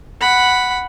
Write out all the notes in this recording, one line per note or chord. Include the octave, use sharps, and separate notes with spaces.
F#5 B5